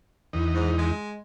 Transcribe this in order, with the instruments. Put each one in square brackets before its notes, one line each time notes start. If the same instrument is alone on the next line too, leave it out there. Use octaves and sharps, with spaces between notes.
[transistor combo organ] E2 D#4
[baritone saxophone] G#2
G#3